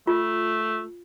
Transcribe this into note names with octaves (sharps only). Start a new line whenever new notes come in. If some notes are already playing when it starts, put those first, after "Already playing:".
A3 F4